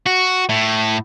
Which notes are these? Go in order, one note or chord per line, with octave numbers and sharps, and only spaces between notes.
F#4
A2